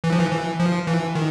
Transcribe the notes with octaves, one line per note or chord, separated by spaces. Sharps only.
E3
F3
E3
E3
F3
E3
D#3